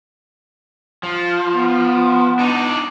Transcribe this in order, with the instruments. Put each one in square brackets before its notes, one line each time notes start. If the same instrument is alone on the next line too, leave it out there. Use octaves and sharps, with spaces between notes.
[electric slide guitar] F3
[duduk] B3
[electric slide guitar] D4 D#4